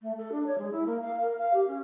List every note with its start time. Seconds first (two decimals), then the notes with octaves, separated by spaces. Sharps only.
0.02 A3
0.17 A4
0.32 D4
0.46 C#5
0.58 G#3
0.72 E4
0.86 A#3
1.02 F5
1.21 A#4
1.38 F5
1.53 G4
1.67 C#4